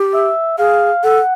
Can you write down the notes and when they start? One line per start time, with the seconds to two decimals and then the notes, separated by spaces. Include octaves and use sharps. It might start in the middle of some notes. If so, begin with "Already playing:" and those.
Already playing: G4
0.14 E5
0.58 G#4 F5
1.03 A4 F#5